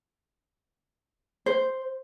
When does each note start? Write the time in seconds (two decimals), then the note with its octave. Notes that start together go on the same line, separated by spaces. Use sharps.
1.46 C5